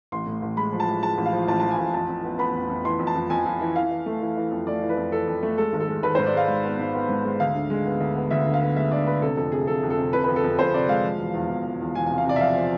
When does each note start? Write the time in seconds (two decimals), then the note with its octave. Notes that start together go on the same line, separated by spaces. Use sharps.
0.12 A1 C6
0.26 A2
0.42 A1
0.57 G#3 B5
0.72 F3
0.80 A5
0.88 G#3
1.03 G#3 A5
1.18 A1
1.26 F5
1.33 F3
1.48 A1 A5
1.60 F3 A5
1.71 G#5
1.78 A1
1.94 F2 A5
2.09 F2
2.24 B3
2.39 B3 B5
2.54 F2
2.69 F2
2.84 E3 C6
2.99 F2
3.07 A5
3.15 F2
3.30 F2 G#5
3.46 F2
3.61 E3
3.76 E3 F5
3.91 E3
4.06 A3
4.21 E3
4.37 E3
4.51 F2
4.67 A3 D5
4.82 E3
4.89 B4
4.97 F2
5.12 E3 A4
5.28 F2
5.43 A3
5.58 G#3 A4
5.73 G#1
5.80 A4
5.88 G#3
6.03 G#1 B4
6.15 G#2 C5
6.26 D5
6.33 G#3 F5
6.49 G#2
6.64 B3
6.79 G#2
6.94 B3
7.09 G#2
7.25 G#3
7.40 D2 F5
7.55 D3
7.70 G#3
7.86 B3
8.00 D2
8.16 B3
8.31 D2 E5
8.46 D3
8.54 F5
8.61 B3
8.76 G#3 E5
8.91 D3 D5
9.07 D3 B4
9.22 C3 A4
9.37 F2 A4
9.52 C3 G#4
9.67 F2 A4
9.83 F2
9.90 A4
9.97 C3
10.13 C3 B4
10.24 F2 B4
10.36 A4
10.44 F2
10.59 F2 C5
10.74 C3 D5
10.89 G#3 F5
11.04 F3
11.19 E1
11.34 E2
11.49 E2
11.65 E2
11.80 E2
11.95 E1 G#5
12.06 C3 G#5
12.18 F5
12.25 C3 D5
12.36 E5
12.41 F3 F5
12.56 F3